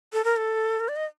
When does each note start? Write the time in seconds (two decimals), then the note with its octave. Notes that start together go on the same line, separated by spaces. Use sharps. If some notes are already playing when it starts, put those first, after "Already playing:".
0.13 A4
0.24 A#4
0.37 A4
0.80 A#4
0.88 D5
0.96 D#5